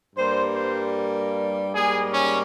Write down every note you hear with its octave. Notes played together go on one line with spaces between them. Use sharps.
G2 G3 A#3 C5
C5
G#2 G3 A#3 G#4
C#4